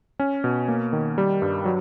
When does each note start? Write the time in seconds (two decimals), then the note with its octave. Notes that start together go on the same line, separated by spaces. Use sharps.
0.20 C#4
0.44 B2
0.68 A#3
0.93 D#3
1.18 G3
1.42 G2
1.65 F#3